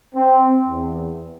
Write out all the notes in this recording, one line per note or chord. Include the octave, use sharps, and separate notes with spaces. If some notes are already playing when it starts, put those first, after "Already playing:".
C4
E2